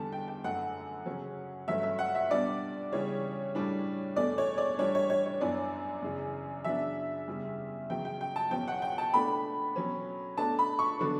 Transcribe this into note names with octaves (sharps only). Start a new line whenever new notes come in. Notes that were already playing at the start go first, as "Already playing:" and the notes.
Already playing: E2 D3 G3 A5
G5
G5
F#2 D3 A3 F#5
C#3 F#3 C#4
G2 F#3 A3 C#4 E5
E5
F#5
E5
B2 G3 B3 D4 D5
C#3 E3 G3 C#5
A2 G3 D4
E2 B2 A3 D5
C#5
D5
A2 E3 G3 D4 C#5
C#5
C#5
C#5
F#2 E3 B3 D4 D5
F#2 C#3 E3
C#3 F#3 B3 D4 E5
E2 C#3 G3
C#3 F#3 B3 G5
G5
G5
A5
E2 B2 F#3 C#4 G5
F#5
G5
A5
B2 A3 D4 B5
B2 F#3 C#4
B2 A3 D4 A5
B5
C#6
D3 F#3 B3 D4